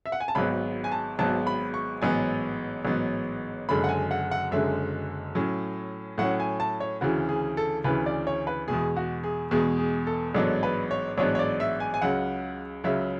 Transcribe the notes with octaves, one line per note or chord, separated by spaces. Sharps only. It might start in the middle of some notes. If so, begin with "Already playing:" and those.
E5
F#5
G#5
A5
G#1 G#2 F#3 B3 B5
G#5
A5
G#1 G#2 F#3 B3 A5
B5
C#6
A1 G#2 F#3 B3 G#5
A1 G#2 F#3 B3
F#1 F#2 D3 G#3 B5
F#5
G#5
F#5
F#5
F#1 F#2 D3 G#3 E5
A2 F#3 C#4
A2 F#3 C#4 F#5
G#5
A5
C#5
D2 C#3 E3 F#4
G#4
A4
D2 C#3 E3 B4
D5
C#5
B4
E2 B2 G#3 G#4
F#4
G#4
E2 B2 G#3 G#4
G#4
A4
A1 G#2 F#3 B3 D4 A4
B4
C#5
A1 G#2 F#3 B3 D4 C#5
C#5
D5
E5
G#5
G#5
C#2 C#3 F#3 F#5
C#2 C#3 F#3 E5